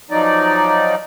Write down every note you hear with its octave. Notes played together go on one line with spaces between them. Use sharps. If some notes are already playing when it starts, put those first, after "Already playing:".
F3 F#3 D#4 D5